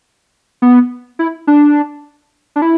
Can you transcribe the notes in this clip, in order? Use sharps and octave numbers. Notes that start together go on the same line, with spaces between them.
B3
E4
D4
D4
E4